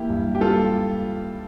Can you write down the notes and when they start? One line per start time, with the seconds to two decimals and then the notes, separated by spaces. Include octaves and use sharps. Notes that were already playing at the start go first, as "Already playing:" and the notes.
Already playing: E3 A#3 E4 G4
0.10 G2
0.35 G4
0.41 G3 F4 A4